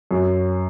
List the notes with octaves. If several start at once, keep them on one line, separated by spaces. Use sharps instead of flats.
F#2